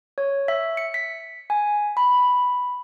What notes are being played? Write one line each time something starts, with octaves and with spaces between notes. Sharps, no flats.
C#5
E5
C#7
B6
G#5
B5